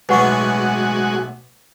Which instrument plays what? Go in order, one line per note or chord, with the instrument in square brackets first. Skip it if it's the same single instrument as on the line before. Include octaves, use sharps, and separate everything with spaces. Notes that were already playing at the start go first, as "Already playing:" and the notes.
[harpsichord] B1 A2 B3 [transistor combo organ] G#3 F#4 [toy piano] B4 F#5 C#6